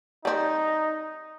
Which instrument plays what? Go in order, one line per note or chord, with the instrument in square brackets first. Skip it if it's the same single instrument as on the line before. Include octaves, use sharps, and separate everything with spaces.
[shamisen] G3 C4 [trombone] D#4